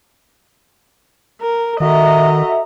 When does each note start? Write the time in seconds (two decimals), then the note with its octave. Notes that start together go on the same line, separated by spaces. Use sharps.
1.42 A#4
1.80 D#3 F#4 A4 D#5 E5 A#5